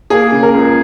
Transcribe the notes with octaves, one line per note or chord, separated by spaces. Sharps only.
A#3 G#4
C#3
A#4
C#2